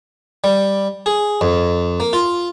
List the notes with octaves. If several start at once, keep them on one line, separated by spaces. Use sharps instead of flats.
G3
G#4
F2
A#3
F4